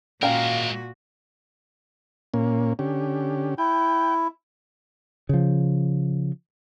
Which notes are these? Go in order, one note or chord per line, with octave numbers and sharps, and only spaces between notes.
A#2 G#3 C#4 F#4 A#4 F5 G5 A#5
A#2 A#3 C#4
D3 C#4 G4
E4 G5
C#3 F3